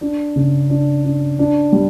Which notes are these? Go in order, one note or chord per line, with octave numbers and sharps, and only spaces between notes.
D4
C#3
D4
D4
D4
G3